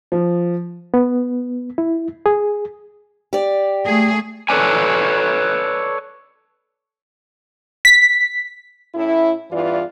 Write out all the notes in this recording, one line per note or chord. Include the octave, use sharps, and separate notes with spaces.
F3
B3
E4
G#4
G4 D5
A3 G#4
A4 B4 C#5 D5 G#5
B6
A2 C#4 E4
E2 G2 E3 F4 D5